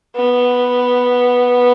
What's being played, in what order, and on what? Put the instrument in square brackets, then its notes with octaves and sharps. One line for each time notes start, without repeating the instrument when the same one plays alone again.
[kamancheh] B3